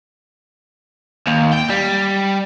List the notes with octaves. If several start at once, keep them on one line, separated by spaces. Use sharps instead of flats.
D#2
G5
G3